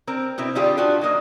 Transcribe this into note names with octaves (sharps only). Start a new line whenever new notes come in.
C4 A#4
B2 C4 E4
D3 G3 C4 F4 G4 G#4
D4 F4 F#4
D#3 F#3 A#3 D#5